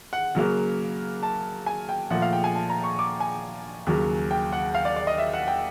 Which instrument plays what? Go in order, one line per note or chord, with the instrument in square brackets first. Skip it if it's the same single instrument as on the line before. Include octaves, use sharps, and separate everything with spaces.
[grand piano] F#5
C#3 F#3 A#3
A5
G#5
G5
A#2 F3 A3 F#5
F5
G5
G#5
A5
A#5
C#6
D6
G#5
D#2 C#3 F#3
G5
F#5
F5
D5
D5
D#5
E5
F#5
G5